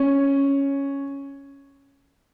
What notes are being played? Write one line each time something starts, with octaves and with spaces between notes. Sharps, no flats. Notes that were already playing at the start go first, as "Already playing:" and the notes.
Already playing: C#4